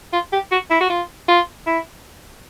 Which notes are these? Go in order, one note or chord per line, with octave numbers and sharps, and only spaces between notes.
F4
G4
F#4
E4
F#4
F4
F4
E4